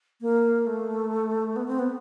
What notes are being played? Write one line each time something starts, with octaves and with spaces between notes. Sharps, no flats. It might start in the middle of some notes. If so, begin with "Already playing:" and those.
A#3
A3
B3
C4
B3